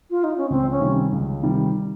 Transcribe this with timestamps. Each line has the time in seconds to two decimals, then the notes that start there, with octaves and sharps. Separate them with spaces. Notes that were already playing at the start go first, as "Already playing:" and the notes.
0.11 F4
0.24 D#4
0.37 C#4
0.50 C#2 C4
0.70 C#4
0.80 C3 D#3 G3
1.12 C#2
1.43 C3 D#3 G3